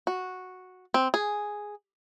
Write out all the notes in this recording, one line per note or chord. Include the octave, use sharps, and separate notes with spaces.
F#4
C4
G#4